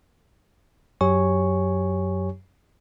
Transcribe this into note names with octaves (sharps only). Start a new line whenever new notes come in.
F#2 F#3 G4 C#5 G#5 C#6